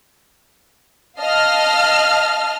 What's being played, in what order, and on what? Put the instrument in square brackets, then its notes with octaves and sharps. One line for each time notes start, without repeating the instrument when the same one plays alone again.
[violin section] D#5 F5 A5 F6